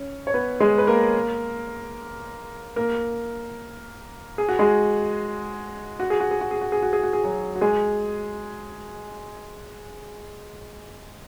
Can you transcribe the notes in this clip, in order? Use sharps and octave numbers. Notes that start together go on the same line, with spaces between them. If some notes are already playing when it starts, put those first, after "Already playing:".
Already playing: C#4
C#5
B3 B4
G#3 G#4
B4
A#3 A#4
A#3 A#4
G#4
F#4
G#3 G#4
F#4
G#4
F#4
G#4
F#4
G#4
F#4
G#4
F#4
G#4
F#4
G#4
F#3 F#4
F#4
G#3 G#4